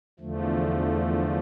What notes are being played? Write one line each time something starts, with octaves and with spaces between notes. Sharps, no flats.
E2 D3 F3 A3